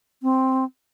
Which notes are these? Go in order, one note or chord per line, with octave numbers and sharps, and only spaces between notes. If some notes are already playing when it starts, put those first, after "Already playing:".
C4